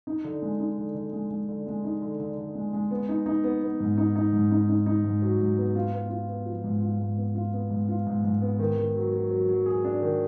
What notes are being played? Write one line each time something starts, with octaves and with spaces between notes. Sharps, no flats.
D#4
D3
G#3
D#4
D3
D3
G#3
G#3
D3
G#3
D#4
D3
D3
D3
G#3
G#3
B3
D#4
D#4
B3
B3
G#2
D#4
D#4
G#2
D#4
D#4
D#4
G#2
F#3
G#2
B3
F4
B3
F4
B3
F3
G#2
F4
G#2
B3
F4
B3
G#2
F4
G#2
G#2
B3
D#3
D#3
F#3
F#3
F#3
F#3
G#4
D4
D#3